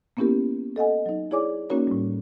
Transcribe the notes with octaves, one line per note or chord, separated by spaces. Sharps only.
A#3 B3 C#4 E4 G4 A#4
A4 D#5 F#5 G#5
F#3 D#4
E4 G#4 C#5 D5 G#5 D6
A#3 C#4 D#4 F#4 A#4 C#5
A2 G3